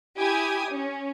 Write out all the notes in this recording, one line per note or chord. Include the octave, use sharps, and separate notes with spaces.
E4 G4 G#5 D#6
C#4